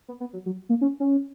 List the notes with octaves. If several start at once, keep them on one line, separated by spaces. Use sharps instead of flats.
B3
B3
F#3
F#3
A#3
C#4
C#4